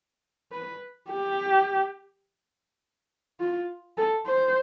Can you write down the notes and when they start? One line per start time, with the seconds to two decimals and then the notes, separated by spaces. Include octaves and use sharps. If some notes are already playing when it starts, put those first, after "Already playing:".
0.52 B4
1.09 G4
3.40 F4
3.97 A4
4.26 C5